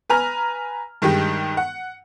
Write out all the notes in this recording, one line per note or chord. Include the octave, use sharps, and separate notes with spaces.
B4 G#5 A#5 F6
G2 D#3 G#3 D#4 G4
F#5